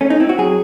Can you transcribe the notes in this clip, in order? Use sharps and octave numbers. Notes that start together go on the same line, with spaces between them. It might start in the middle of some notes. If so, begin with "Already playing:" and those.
A3 C#4
D#4
C4 E4
F#4
F#3 G#4